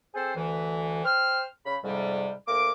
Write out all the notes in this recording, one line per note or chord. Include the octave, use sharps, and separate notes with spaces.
C4 G#4 A4 C5
D2 E3
C5 G5 F6
C#3 B5
F2 G#2 C3 G3
D2 A#3 D6